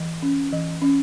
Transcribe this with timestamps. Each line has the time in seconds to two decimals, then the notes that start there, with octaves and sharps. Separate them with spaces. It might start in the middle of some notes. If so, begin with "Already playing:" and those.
Already playing: E3
0.22 C#4
0.53 E3
0.82 C#4